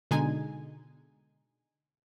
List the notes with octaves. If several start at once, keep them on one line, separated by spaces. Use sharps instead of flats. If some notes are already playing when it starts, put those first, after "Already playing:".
B2 D3 G#3 D#4 G#5